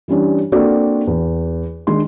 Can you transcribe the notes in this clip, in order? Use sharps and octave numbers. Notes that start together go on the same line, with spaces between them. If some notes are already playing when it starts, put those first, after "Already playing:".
E3 G3 C#4 D4
A#3 C4 D4 F#4 A4 D5
E2
D#3 G#3 D4 C6